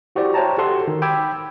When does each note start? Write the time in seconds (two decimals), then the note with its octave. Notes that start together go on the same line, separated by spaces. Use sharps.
0.16 E4 F#4 G4 C5 D5
0.34 C5 C#5 E5 G5 A5 A#5
0.58 F#4 G4 A4 F#5 A5 C6
0.88 D#3
1.02 G5 B5 D6 E6 G#6